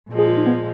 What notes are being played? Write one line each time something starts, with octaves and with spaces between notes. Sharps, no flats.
A#2 F3 G#3
G#4
F4
D#4
B3